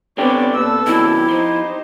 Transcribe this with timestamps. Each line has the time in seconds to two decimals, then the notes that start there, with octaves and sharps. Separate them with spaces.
0.18 D3 B3 C4 D4 G4 C#5 D5
0.56 A#2 A4 B4 E6
0.87 B2 D#3 F#3 E4 G4
1.29 F3 D#4 C5